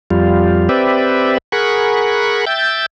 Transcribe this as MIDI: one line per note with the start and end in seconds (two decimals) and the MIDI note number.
0.11 0.69 41
0.11 0.69 55
0.11 0.69 65
0.69 1.38 60
0.69 1.38 67
0.69 1.38 71
0.69 1.38 74
0.69 1.38 76
1.52 2.45 68
1.52 2.45 70
1.52 2.45 78
1.52 2.45 83
1.52 2.45 85
2.47 2.86 76
2.47 2.86 79
2.47 2.86 91
2.47 2.86 93